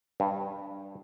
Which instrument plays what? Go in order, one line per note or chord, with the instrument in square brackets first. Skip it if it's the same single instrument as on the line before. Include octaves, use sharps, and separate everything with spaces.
[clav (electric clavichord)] G2